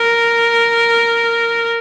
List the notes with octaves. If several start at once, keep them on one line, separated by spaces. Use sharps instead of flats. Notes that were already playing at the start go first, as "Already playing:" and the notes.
Already playing: A#4